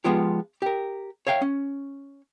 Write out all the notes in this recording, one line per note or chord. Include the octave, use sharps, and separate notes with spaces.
F3 G#3 B3 F4 G4
G4 A#4
C#5 E5 F5 G5
C#4